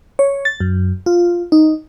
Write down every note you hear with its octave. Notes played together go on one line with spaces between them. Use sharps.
C#5
A6
F#2
F4
D#4